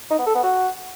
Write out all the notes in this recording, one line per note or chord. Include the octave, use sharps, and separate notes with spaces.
D#4
B3
A4
B3
F#4